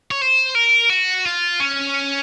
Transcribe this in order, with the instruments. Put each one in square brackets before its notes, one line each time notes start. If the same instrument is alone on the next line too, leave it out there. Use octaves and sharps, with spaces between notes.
[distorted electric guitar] C#5
C5
A#4
F#4
F4
C#4